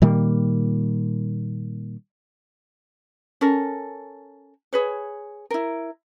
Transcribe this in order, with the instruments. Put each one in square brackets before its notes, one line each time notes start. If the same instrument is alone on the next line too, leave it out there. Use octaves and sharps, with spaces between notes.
[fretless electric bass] A#2 D#3 G3 A#3
[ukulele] C#4 A4 A#4
G#4 B4 C#5
E4 A#4